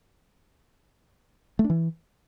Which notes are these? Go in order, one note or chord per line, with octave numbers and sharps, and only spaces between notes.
A3
D4
E3